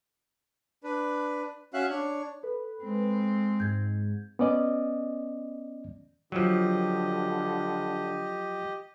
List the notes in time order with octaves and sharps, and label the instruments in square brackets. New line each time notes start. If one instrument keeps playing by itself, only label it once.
[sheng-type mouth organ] D4 B4
C#4 F#4 E5 F5 F#6
D4 C#5
[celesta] A4 [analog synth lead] B4
[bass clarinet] G#3 [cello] C4
[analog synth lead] G#2 [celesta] G6 G#6
[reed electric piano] B3 C#4 D5 D#5
[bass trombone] D3 [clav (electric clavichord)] F3 F#3 [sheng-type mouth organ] G4 D#5